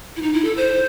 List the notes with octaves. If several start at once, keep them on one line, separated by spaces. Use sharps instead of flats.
E4
D#4
E4
A4
C5